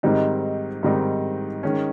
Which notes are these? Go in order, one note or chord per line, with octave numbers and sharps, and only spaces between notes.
G#2 D#3 G3 C4 D#4
G#2 D#3 G3 C4 D#4
D#3 G#3 C#4